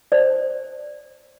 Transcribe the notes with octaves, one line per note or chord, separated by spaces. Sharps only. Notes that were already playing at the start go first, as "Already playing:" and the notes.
C5 D5